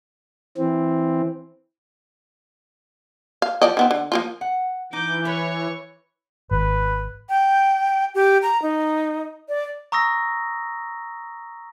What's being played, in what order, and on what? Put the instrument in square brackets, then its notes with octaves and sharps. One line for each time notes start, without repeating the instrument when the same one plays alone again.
[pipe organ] E3 C4
[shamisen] F5
F3 D5 D#5
D#3 B3 C4
D3
F3 A#3 F4
[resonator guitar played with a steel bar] F#5
[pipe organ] E3 [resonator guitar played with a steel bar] D#4 [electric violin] D6 G6
[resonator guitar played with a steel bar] E4 B4 [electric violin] C#5 C#6
[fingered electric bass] G#1 [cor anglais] B4
[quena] G5
G4
A#5
D#4
D5
[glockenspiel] A#5 C#6 D#6 E6 A#6